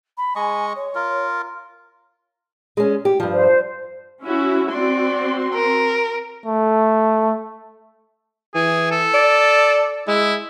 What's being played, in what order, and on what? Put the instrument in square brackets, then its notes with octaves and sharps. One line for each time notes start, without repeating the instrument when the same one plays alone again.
[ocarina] B5
[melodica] G#3 D#5 C#6 [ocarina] G#5
[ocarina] C#5
[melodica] F4 A#4
[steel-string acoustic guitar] G#3 C#4
G4
G2 F3
[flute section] C5
[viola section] C#4 E4 F#4
[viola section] C4 F#4 C6 [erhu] D5
[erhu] A#4
[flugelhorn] A3
[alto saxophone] E3 [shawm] G#4
[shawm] A4
[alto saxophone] D5
[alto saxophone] G#3 [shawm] E4